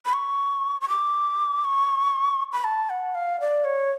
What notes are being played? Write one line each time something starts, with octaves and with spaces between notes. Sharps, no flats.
B5
C#6
C#6
D6
C#6
B5
A5
F#5
F5
D5
C#5